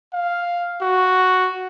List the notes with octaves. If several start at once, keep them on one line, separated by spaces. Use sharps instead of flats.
F5
F#4